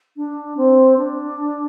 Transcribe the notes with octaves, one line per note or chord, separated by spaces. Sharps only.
D4
C4
D4